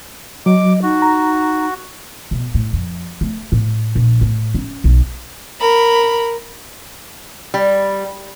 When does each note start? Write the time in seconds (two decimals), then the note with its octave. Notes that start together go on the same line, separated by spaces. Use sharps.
0.46 F#3 D#5 D6
0.83 D#4 F#4
1.02 A#5
2.31 B2
2.54 A2
2.73 F2
3.21 A3
3.52 A2
3.95 A#1
4.21 A2
4.54 C#4
4.84 B1
5.61 A#4 B5
7.54 G3